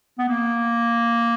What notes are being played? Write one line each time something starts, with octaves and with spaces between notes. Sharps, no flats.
B3
A#3